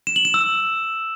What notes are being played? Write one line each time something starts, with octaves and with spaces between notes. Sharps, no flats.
E7
F#7
E7
E6